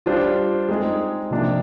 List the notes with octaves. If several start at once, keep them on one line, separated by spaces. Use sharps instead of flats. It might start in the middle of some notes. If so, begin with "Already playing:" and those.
G3 D4 F4 C5
G#3 C4 D#4 G#4
C3 F3 A#3 D4